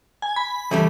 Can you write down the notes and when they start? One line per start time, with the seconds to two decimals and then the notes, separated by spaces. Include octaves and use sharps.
0.22 G#5
0.36 B5
0.71 C#3 E3 G3 A3